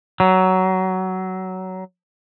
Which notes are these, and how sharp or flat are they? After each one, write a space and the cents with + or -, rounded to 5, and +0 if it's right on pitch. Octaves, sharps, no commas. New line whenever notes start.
F#3 +15